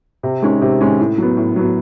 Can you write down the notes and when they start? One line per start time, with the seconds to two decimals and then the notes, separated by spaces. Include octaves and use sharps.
0.23 C3
0.42 D#3 G#3 C#4
0.62 C3
0.81 D#3 G#3 C#4
0.99 A2
1.18 F#3 B3
1.37 A2
1.56 F#3 B3